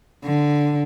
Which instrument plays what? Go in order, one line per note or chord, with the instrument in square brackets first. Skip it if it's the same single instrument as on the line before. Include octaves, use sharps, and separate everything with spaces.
[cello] D3